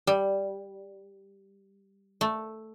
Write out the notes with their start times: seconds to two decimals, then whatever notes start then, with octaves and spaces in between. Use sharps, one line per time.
0.07 G3
2.21 A3